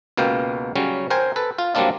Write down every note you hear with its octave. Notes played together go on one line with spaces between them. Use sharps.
C#2 B2 A#3 F5 G5
C#3 F#3 G3 C#4
A#4 C5 G5 G#5
A4 B4
F4
F#3 G3 A#3 C4 D4 F4